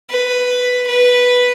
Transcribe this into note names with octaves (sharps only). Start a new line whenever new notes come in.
B4
B4